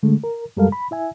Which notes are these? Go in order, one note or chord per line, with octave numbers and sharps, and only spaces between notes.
D3 G#3 A3
A#4
F#2 G3 G#3 A4 A#4 F5
B5
E4 E5 G#5